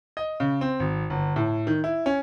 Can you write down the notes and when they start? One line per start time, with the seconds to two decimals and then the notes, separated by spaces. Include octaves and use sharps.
0.17 D#5
0.40 C#3
0.61 C4
0.80 G#1
1.10 G1
1.36 A2
1.67 D#3
1.84 E4
2.06 C#4